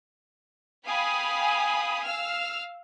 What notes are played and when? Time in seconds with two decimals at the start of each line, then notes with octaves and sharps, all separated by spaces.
0.86 F5 G5 G#5 B5 D#6
2.06 F5 E6 F6